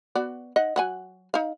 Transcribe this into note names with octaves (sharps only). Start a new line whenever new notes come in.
B3 F#4 D5
D#4 D#5 F#5
F#3 F#5 G#5
D#4 F5